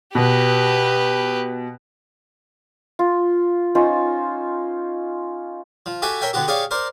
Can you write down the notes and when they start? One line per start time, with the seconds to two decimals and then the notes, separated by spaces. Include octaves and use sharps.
0.15 B2 G4 B4
2.99 F4
3.75 C#4 D#4 F4 C5
5.86 F3
6.02 F#4 G4 A4 E5 G#5
6.21 A#4 C#5 E5 G5 G#5
6.33 B2 D3 B3 F#4 G4
6.48 G4 G#4 C#5 D5 F5 C#6
6.71 A#4 C5 D5